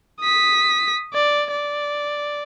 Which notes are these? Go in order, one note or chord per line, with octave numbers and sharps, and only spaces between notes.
D#6 B6
D5
D5